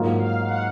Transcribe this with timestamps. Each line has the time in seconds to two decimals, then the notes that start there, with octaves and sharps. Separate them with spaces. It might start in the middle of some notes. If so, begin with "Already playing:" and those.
Already playing: G#2 F#3 A#3 F4
0.19 F5
0.46 F#5